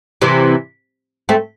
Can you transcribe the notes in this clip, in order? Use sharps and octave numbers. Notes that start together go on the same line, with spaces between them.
C3 E3
A3 C4